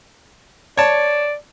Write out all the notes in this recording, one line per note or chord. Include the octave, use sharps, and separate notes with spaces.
C#5 D5 A5